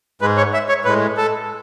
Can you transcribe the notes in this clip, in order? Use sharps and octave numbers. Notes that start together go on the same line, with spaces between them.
G#2 G#3 B4
C#5
E5
C#5
A2 G#3 B4
A4